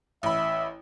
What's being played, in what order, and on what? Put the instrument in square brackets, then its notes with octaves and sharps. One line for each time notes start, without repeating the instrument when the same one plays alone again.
[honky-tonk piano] A1 B5 [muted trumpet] E5